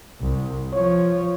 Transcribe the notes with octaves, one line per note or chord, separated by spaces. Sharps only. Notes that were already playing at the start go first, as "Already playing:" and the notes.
C2
F3 C#5